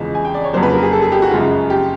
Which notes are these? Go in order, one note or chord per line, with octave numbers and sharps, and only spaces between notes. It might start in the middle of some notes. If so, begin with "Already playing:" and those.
Already playing: E2 C#3 F3 G#3
G#5
G5
D5
C#5
F2 C#3 F#3 A#3 C5
B4
A#4
G#4
A4
G#4
G4
F#4
F#2 C#3 F3 G#3 F4
G4